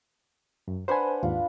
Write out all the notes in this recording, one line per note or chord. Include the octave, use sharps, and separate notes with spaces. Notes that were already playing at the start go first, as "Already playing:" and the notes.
F#2
D4 B4 C5 F#5 G#5
D#2 G#2 F4